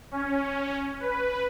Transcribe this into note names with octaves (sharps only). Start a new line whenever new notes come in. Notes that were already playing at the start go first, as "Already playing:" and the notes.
C#4
B4